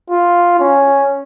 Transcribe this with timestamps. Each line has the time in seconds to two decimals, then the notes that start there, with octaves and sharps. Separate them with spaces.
0.10 F4
0.60 C#4